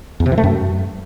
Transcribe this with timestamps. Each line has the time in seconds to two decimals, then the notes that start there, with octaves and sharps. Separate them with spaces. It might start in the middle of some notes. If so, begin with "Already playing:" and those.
0.20 E2
0.26 C3
0.32 E3
0.38 A3
0.44 F#2